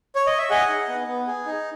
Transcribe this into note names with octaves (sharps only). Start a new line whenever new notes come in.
C#5
D#5
E5
G#4 D#5 F#5
D#4
B3
B3
G#4
D#4